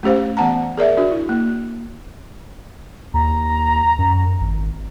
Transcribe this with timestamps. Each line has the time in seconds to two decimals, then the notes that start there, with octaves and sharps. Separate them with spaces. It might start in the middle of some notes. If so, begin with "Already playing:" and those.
0.03 A3 C#4 G4 C5 F5
0.37 E3 B3 F#5 A5 A#5
0.77 G#4 A#4 D5 E5
0.97 D4 F#4
1.11 E4
1.29 A#3
3.14 D#2 A#5
3.99 F#2
4.41 G#1